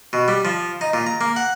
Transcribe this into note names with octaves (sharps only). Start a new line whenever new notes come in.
B2
G3
F3
D#4
A#2
A#5
A#3
F#5